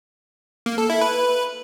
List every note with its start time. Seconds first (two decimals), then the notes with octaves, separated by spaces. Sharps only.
0.66 A#3
0.78 A4
0.90 E4
1.01 B4